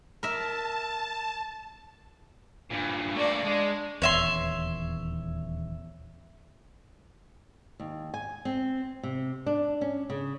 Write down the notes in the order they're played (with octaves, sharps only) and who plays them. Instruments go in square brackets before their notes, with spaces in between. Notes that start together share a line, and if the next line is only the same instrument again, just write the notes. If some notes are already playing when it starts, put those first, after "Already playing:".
[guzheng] A#4 E5 [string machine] A5
[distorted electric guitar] G2 A#2
[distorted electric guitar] A3 A#3 [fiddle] D4 D5
[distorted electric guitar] G#3 [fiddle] D4
[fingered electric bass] D#1 E2 [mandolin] C#5 E5 C6
[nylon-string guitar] D#2
G#5
C4
C3
D4
C#4
C#3